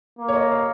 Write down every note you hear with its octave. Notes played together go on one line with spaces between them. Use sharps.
A#3
C#5
D#5
F5